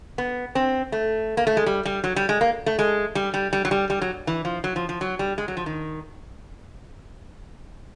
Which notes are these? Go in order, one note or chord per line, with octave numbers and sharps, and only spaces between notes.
B3
C4
A3
A#3
A3
G#3
G3
G3
F#3
G3
G#3
A#3
A3
G#3
G3
G3
G3
F#3
G3
G3
F#3
E3
F3
F#3
F3
F3
F#3
G3
G#3
F#3
F3
D#3